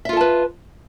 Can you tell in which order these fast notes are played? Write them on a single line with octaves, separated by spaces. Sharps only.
E5 F4 A4 A5 B4